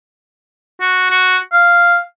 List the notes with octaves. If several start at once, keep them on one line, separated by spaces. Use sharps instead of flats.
F#4
F#4
F5